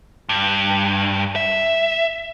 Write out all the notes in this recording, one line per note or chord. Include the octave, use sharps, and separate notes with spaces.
G2
E5